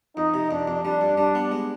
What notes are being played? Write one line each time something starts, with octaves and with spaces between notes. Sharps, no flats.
F2 D#4
C3
F2 D4
F2
G3 D4
G2
G3 D4
B3
G#3